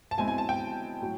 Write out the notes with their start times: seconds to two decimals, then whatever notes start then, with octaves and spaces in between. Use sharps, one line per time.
0.11 A5
0.17 B2 G#3 C4 E4 G#5
0.28 G#5
0.38 A5
0.49 G5
1.02 A2 F#3